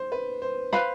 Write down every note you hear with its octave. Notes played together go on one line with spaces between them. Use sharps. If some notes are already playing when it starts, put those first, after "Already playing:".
Already playing: C5
B4
C5
B4 C5 F5 B5